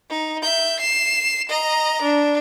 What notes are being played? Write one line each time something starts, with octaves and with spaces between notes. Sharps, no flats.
D#4
E5 G6
C7 E7
D#5 A#5
D4